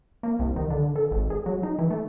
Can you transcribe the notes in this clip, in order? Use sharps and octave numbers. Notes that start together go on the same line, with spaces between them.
A#3
C2
D#3
D3
A4
G#1
G#4
F#3
D#4
E3
A3